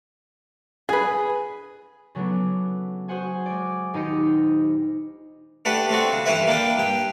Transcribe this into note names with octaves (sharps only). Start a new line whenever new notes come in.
G#4 B4 G#5
C#3 F#3 A3 B3 D4
F#4 G#4 C5 F#5 G#5
G#3 D5
D#1 D#4 G4 C5 D#5 C#7
A3 D4 G4 B4 F#5
A3 C4 D4 F#4
C#3
G2 E3 E4 B4 E5
A#3 D4 E4 G5
G2 G5